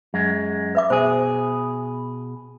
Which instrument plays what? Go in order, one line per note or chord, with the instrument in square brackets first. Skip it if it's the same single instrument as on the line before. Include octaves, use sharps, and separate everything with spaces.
[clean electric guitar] F#2 G#3
[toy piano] B4 E5 D6
[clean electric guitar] B2 G#4 [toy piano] C5